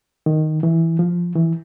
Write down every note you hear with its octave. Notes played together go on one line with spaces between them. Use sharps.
D#3
E3
F3
E3